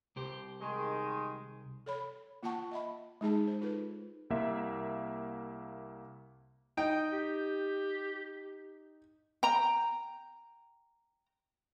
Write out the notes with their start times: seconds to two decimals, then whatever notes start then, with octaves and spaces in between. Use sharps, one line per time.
0.16 C2 G4 C5
0.60 D#3 G#3
1.86 A4 C#5 B5
2.43 A#3 F4 F#5 G5 A5 C#6
2.71 D#5 E5 B5
3.21 G#3 D#4 G#4 A5
3.47 C5
3.61 D#4 F4 A4 B4
4.30 C2 A#3 E5
6.77 D#4 G5
7.12 G4
9.43 G5 A#5